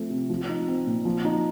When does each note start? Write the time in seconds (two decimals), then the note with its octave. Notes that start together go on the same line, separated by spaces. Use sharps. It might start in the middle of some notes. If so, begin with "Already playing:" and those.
Already playing: F3 A3 C4
0.10 C3
0.30 F3
0.49 D#4
0.68 C4
0.86 A#2
1.05 F3
1.25 D#4